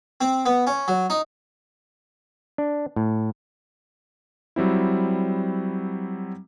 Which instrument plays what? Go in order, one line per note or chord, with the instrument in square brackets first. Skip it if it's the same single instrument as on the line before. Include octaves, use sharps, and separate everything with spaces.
[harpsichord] C4
B3
C#4
F#3
D#4
[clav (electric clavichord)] D4
A2
[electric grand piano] F#3 G3 C4 E4